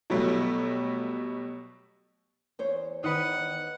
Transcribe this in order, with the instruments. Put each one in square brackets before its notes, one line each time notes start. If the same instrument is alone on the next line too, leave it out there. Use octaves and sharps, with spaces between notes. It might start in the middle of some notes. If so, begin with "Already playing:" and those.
[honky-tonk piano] B2 F#3 G3 A3
[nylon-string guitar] E2 C5 C#5
[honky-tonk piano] D#3 [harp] B4 D#5 [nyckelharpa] F#5